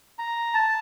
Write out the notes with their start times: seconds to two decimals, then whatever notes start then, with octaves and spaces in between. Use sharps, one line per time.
0.19 A#5
0.54 A5